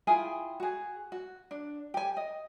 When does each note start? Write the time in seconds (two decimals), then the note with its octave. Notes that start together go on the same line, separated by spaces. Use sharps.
0.07 E4 F4 G#4 G5
0.60 F#4 G#4
1.12 F#4
1.51 D4
1.94 G4 G#5
2.17 D#5